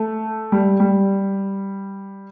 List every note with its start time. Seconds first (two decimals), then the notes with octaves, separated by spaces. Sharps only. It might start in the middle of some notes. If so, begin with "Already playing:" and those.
Already playing: A3
0.52 G3
0.80 G3